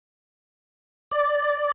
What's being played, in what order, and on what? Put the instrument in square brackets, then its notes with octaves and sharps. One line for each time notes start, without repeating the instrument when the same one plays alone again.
[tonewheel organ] D5